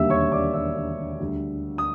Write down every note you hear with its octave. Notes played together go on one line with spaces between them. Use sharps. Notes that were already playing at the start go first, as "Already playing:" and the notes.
Already playing: E1 D#2 D3 G3 A#3 E5 E6
C#5 C#6
D5 D6
E5 E6
D2 D3 G3
D#6